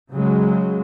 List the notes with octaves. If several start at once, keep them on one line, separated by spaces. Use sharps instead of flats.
C#3 F#3 G#3